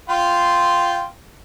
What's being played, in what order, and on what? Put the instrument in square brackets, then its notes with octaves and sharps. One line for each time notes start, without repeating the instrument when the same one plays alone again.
[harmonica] F4 G5 C6